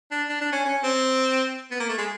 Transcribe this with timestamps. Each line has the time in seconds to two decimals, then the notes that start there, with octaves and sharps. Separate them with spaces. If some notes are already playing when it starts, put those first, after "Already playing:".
0.12 D4
0.29 D4
0.41 D4
0.52 C#4
0.65 C#4
0.83 C4
1.71 B3
1.80 A#3
1.89 A3
1.98 G#3